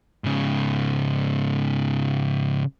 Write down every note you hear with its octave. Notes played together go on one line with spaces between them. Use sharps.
G#2 C#3